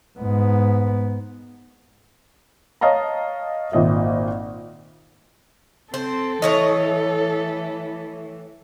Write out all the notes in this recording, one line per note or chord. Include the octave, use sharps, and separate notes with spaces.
G#2 B3
C#5 D#5 F5 A5 A#5
G#1 A#2 D#5 E5
C4 A4 C5
A2 E3 C#5 D#5